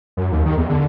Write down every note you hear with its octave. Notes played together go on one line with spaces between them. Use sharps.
F#2
D#2
D#3
E2
D3